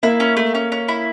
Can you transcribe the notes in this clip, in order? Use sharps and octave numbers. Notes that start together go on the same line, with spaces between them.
A#3 E4
C#4
A3
C#4
C#4
E4